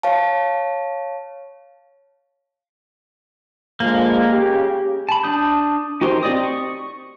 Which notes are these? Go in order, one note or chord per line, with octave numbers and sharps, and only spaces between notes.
C#5 F5 A5
D3 F3 G#3 A#3
C#3 G4
A5 B5
D4 A5 D#6 G6
D#4 F#4 G4 A#4 C5
C4 G4 D5 D#5 D#6
C#6